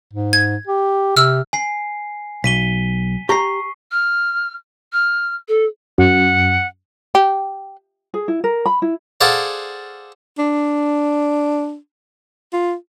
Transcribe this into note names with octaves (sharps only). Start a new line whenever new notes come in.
G#2
G#6
G4
C3 E6 F6
G#5 C7
B1 B6 D#7 G7
G4 A#5 C#6 C7
F6
F6
A4
F#2 F#5
G4
G#4
E4
A#4
B5
E4
G#4 A4 C5 D5 F5 F#5
D4
F4